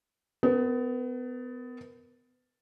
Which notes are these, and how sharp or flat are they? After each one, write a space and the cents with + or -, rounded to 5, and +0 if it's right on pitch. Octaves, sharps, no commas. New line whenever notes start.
B3 +30 A#4 +0